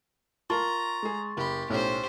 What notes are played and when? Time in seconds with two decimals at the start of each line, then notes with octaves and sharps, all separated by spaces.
0.50 F4 A#4 A5 A#5 C6 C#6 A6
1.02 G#3 G#4
1.37 F#1 G4 B5
1.70 B1 A2 C#4 G4 C5